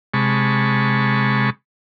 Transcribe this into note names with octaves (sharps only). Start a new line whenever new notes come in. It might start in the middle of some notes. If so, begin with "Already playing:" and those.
C3 G#3 A5 B5 C#6